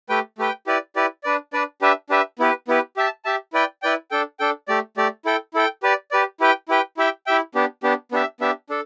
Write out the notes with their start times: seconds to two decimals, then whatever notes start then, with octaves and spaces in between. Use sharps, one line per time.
0.09 A3 G4 B4 G5
0.38 A3 G4 B4 G5
0.67 E4 G4 B4 D5
0.96 E4 G4 B4 D5
1.24 D4 B4 D5
1.53 D4 B4 D5
1.82 D4 G4 B4 E5
2.10 D4 G4 B4 E5
2.39 B3 E4 G4 B4
2.68 B3 E4 G4 B4
2.97 G4 E5 A5
3.25 G4 E5 A5
3.53 E4 B4 D5 G5
3.82 E4 B4 D5 G5
4.11 D4 A4 G5
4.40 D4 A4 G5
4.68 A3 G4 D5
4.97 A3 G4 D5
5.25 E4 A4 G5
5.54 E4 A4 G5
5.83 G4 B4 D5
6.11 G4 B4 D5
6.40 E4 G4 B4 G5
6.69 E4 G4 B4 G5
6.97 E4 G4 E5 G5
7.27 E4 G4 E5 G5
7.55 B3 D4 G4
7.83 B3 D4 G4
8.12 B3 D4 G4 E5
8.40 B3 D4 G4 E5
8.70 D4 A4